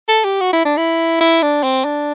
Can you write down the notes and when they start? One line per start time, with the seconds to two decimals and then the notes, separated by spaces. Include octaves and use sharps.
0.08 A4
0.25 G4
0.41 F#4
0.53 E4
0.65 D4
0.77 E4
1.21 E4
1.42 D4
1.63 C4
1.85 D4